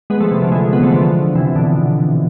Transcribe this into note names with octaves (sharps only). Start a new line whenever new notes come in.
G#3 B3
F3 A3
C3 E3
D3 F3
E3 G#3
G#3 B3
F3 A3
D3 F3
C3 E3
B2 D3